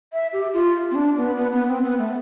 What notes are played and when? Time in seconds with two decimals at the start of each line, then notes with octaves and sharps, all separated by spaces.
0.13 E5
0.33 G4
0.54 F4
0.91 C4
0.95 D4
1.17 B3
1.36 B3
1.53 B3
1.68 C4
1.84 B3
1.99 A3